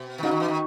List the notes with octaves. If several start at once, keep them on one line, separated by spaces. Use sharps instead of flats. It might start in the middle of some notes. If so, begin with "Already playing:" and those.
Already playing: B2
D#3
C#3 D#4 F#4
D#3
E3
D#3